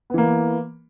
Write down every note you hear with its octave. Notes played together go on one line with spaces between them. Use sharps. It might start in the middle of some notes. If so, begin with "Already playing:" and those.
E3 A#3 B3